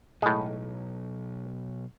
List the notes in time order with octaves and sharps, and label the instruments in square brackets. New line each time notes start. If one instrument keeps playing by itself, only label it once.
[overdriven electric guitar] B1 [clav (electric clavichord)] A2 G#3